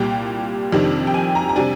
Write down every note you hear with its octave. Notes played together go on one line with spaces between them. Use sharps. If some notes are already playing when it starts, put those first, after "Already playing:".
Already playing: C2 A#2 G3 G5
F2 C3 D#3 G3 D4
G5
G#5
A#5
A#5
C3 G3 D4 G#5